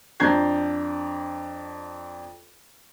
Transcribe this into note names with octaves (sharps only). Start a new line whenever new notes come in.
F2 D4 A#5 G6 G#6 C7